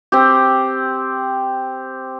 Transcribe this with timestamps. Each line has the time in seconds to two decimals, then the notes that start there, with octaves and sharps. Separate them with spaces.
0.12 C4 G4